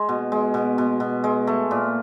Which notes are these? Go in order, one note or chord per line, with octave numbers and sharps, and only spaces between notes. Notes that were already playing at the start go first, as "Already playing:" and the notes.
Already playing: G#3
B2
G#3
B2
B2
B2
G#3
A3
A#2